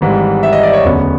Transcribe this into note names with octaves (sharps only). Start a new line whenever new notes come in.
G#1 G#2 E3 G3
E5
D#5
D5
C#5
E1 D2 C#3 F#3 B3